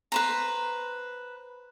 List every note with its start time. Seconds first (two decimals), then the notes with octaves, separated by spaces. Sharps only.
0.12 B4 C5 A#5